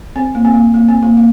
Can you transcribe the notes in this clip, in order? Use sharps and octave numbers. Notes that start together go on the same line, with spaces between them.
C4
A#3
C4
A#3
A#3
C4
A#3
A#3